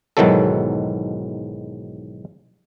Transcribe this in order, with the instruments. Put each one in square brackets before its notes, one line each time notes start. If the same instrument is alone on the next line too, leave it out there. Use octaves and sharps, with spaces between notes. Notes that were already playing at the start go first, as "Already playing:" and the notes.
[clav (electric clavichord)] B1 G#2 D#3 E3 F#3 A4